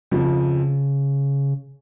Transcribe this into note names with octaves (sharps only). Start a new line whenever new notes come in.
F2 C#3 F3